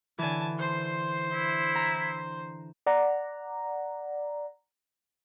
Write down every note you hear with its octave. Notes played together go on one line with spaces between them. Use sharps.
D3 E3 G#5 A5
C5 C6
E4
A#5
D5 F#5 A#5